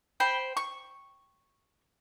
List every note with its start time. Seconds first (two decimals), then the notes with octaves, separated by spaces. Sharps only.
0.20 C5 G5 B5
0.57 C#6